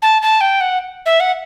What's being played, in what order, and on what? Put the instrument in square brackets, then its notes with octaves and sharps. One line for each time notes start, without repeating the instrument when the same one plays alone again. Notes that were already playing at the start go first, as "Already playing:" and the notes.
[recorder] A5
A5
G5
F#5
E5
F#5